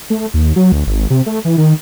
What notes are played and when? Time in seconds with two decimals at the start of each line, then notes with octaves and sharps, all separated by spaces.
0.10 A3
0.34 D#2
0.56 F#3
0.72 D2
0.87 G#1
1.10 C3
1.26 A3
1.45 E3
1.58 D#3